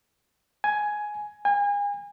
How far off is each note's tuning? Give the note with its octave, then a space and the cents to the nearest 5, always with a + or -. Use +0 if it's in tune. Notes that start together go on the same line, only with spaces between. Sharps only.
G#5 +10
G#5 -35